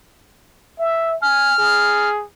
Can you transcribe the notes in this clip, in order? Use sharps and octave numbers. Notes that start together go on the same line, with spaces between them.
E5
G#5 F6
G#4